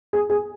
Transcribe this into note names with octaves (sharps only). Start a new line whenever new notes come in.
G#4
G#4